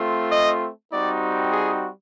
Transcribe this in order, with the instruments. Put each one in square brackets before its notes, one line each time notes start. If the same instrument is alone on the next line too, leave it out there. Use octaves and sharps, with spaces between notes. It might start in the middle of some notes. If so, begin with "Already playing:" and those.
Already playing: [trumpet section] A3 C4 F4
D#5
G3 C4 D#4 F#4 D5
G#4